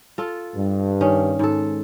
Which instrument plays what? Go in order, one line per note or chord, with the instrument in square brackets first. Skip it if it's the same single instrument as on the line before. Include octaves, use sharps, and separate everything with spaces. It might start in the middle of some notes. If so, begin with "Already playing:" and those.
[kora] F4 A4
[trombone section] G2
[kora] D#3 C#4
G#2 A4